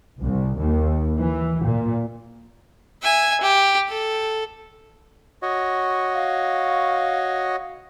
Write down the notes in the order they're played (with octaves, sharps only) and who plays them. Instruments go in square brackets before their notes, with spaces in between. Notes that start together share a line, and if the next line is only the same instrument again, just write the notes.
[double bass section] C2
D#2
E3
A#2
[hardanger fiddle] E5 G#5
G4
A4
[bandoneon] F#4 C#5 D#5
[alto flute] F5